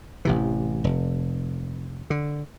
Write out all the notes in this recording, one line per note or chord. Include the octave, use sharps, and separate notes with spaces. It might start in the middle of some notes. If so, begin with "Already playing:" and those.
A1 C3 E3
F1
D3